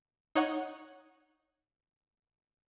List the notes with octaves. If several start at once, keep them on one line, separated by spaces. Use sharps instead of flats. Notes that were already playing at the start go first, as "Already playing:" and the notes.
D#4 C#5 F#5 C#6